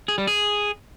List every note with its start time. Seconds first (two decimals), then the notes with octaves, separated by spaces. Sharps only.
0.08 G#4
0.18 G3
0.27 G#4